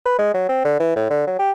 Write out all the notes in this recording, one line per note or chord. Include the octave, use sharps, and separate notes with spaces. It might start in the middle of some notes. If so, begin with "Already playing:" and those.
B4
G#3
F#3
C4
D3
E3
A2
D3
F#3
G4